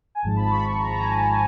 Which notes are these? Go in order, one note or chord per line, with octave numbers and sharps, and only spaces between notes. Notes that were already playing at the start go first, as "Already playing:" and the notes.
G#5
G#1 G#2 F3 A5
B5
C#6
B5
A#5
A5
G#5
G#5
A5